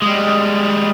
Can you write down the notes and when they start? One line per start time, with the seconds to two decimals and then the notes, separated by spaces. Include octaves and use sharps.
0.02 G3 G#3